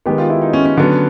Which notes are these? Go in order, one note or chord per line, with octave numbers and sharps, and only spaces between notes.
D#3 G#3 B3 G4
F4
E4
D#4
C#4
C#4
D3 F#3 B3